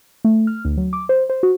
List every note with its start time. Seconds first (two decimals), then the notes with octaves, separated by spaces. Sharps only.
0.25 A3
0.47 F6
0.65 D2
0.77 F#3
0.93 D6
1.09 C5
1.30 C5
1.43 F#4